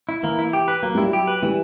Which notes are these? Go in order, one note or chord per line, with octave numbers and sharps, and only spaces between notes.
E4
E3 A#3
E4
G4
B4
F#3 A#3
G3 E4
F#3
G4
B4
E3 G3